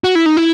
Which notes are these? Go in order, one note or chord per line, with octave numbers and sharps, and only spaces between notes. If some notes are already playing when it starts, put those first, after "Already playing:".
F#4
E4
D#4
E4